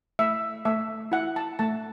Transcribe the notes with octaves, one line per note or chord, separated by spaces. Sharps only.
A3 E5
A3 E5
E4 F#5
A5
A3 A5